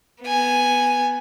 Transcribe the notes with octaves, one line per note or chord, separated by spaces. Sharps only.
B3 G#5